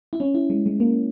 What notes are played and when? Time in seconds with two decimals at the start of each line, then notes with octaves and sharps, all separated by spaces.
0.13 E4
0.20 C#4
0.35 E4
0.50 G#3
0.66 G#3
0.80 A#3